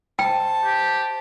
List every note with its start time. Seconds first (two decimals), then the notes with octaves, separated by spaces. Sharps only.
0.19 C5 G5 A5
0.65 G4